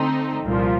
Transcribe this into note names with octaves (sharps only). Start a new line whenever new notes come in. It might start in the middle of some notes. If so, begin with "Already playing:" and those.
Already playing: D3 A3 C4 D#4 A4
C2 A#2 F3